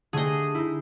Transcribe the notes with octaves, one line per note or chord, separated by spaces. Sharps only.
D3 A3 G4 G#4 D#5
D#4 E4